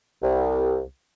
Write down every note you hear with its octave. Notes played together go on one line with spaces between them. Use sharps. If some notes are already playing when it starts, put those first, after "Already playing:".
C2